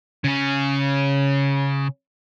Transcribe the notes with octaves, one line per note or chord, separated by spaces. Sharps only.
C#3 C#4